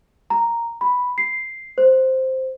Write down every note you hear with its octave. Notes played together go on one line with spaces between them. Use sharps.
A#5
B5
C7
C5